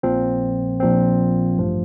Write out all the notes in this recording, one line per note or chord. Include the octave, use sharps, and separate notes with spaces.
A#1 A#2 F3 C4
A#1 A#2 F3 C4
A1 G2 F3 A3